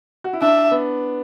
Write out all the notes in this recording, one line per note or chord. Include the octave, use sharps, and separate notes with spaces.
F#4
E4
D4 E5
B3